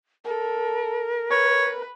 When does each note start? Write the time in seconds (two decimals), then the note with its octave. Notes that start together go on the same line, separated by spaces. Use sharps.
0.25 A4 A#4
1.31 B4 C#5